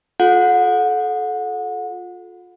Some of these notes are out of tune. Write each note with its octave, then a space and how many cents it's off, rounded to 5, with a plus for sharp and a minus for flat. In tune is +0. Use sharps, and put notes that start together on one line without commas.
F4 +30 A4 -25 F#5 -30